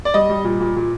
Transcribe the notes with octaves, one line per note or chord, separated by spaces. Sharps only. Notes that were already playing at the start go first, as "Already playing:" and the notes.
D5
G3 D#5
G3
A#2
A#2
A#2